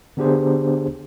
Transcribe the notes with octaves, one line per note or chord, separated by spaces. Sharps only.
D3 B3 D4 G4 G#4 C5